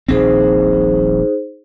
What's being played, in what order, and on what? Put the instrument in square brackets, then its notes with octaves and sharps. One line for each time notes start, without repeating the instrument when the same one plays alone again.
[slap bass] D#1 A#1 C4 [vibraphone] D#4 G#4 C5